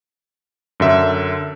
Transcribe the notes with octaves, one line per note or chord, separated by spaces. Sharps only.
F#2 D3 E5